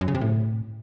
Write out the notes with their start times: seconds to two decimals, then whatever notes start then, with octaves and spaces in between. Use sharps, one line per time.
0.01 F#2
0.08 C#3
0.15 C3
0.21 A2